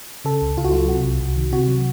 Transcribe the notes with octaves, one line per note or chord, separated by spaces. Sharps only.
C#3 A4
C#2
C#2 F4
F#4
F#3 F4
C3 F#4
C2
C2
D#3
C3 F#4
F#3